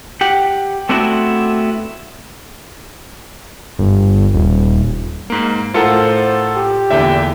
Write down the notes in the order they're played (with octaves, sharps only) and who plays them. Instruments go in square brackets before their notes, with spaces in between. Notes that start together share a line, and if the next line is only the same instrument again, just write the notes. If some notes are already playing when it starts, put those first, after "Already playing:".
[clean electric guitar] G4 F#5
A3 B3 C4 D4 E4 F#4
[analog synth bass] G1
D#1
[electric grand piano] G#2 A#3
[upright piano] A2 A#4 C#7 [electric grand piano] F4 A4 F#5 [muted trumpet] C5
[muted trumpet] G4
[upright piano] E2 A#2 D3 [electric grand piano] E5 G5